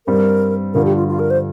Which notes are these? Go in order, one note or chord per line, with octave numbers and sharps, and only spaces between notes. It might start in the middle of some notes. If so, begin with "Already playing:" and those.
G2 G3 C4 A#4
G2 D3 F3 A#4
G4
F4
F4
A#4
C5